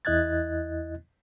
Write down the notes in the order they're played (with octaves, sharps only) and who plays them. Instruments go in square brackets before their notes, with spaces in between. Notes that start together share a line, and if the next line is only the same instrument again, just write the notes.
[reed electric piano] E2 E4 D#5 F#6 G#6 A6